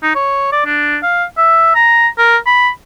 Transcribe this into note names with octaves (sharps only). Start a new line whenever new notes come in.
D#4
C#5
D5
D4
F5
E5
A#5
A#4
B5